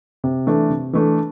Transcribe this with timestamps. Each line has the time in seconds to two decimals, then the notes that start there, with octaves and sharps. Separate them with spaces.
0.24 C3
0.47 E3 A3 D4
0.70 C3
0.93 E3 A3 D4